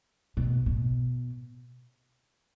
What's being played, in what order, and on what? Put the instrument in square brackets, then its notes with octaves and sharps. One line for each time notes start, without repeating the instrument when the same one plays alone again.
[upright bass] B2
B2